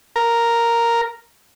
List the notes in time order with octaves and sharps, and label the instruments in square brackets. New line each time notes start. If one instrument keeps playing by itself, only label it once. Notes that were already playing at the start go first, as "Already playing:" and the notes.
[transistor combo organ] A#4